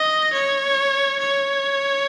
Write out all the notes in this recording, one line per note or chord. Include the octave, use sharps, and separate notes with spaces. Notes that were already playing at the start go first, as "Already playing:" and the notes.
Already playing: D#5
C#5
C#5